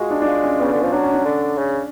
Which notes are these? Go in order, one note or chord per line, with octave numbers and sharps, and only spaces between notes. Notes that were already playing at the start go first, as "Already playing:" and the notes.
Already playing: G#3 F4 F#4 G#4
D4
D4
F4
C#4
C#3 B3
D3 C#4
F3
F#3 D4
C#4
D4
D3
C#3